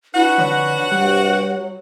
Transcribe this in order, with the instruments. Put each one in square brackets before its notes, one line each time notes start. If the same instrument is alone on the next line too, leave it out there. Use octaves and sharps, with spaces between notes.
[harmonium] D4 B4 [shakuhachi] E4 [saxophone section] F#4 F#5
[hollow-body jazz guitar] F2 D3 [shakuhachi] C#5
[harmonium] G2 C3 G5 [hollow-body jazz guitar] G3
[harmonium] F#3